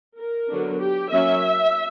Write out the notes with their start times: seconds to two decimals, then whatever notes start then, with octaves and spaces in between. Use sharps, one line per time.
0.18 A#4
0.49 D3 F#3 B3 D4
0.80 G4
1.11 F#3 A#3 C#4 E5